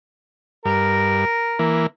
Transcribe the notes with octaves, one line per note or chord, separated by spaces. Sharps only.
G2 A#4
E3 A#3